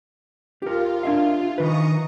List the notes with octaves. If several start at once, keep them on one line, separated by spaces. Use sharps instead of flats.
F4 G4 A#4
D4 E5 F5
D#3 B4 A#5 C#6 D#6